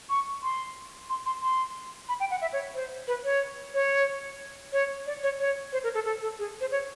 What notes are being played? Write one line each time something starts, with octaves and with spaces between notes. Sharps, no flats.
C#6
C6
C6
C6
C6
B5
G5
F#5
E5
C#5
C5
B4
C#5
C#5
C#5
D5
C#5
C#5
C5
A#4
A4
A4
A4
G#4
C5
C#5